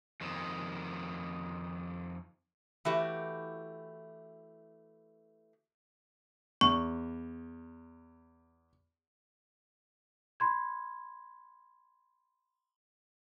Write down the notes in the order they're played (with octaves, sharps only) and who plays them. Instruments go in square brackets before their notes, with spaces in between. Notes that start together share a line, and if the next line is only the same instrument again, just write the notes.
[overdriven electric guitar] F2 D#3
[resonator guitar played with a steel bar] E3 A3 F#4 G4
[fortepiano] E2 [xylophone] C#6
[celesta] B5 C6 G#6